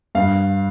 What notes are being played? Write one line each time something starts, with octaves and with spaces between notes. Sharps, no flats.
G2 F5